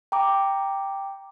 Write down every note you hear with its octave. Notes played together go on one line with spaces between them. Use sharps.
G5 A#5 D6